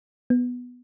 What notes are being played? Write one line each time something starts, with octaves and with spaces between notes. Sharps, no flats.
B3